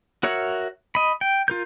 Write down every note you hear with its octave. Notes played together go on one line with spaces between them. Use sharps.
F#4 A#4 C#5 E5 F#5
D#5 B5
G5
F4 A#4 G6